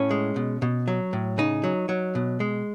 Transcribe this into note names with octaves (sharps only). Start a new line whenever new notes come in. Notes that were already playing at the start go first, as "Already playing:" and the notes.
Already playing: A2 C#4
G#3
B2
B2
F#3
A2
C#3 D#4
F#3
F#3
B2
G#3